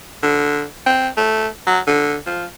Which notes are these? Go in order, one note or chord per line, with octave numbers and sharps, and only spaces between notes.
D3
C4
A3
F#3
D3
F3